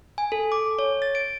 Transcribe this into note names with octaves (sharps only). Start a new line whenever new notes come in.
G#5
A4
D6
C#5
A6
D7